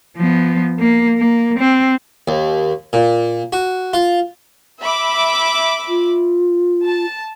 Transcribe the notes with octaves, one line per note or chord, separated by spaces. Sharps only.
F3 B3
A#3
A#3
C4
D#2
A#2
F#4
F4
E5 B5 D6
F4
A5